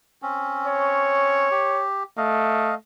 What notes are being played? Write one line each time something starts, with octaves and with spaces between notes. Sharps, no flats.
C4 C#4
C#5
G4
A3 D#5 F5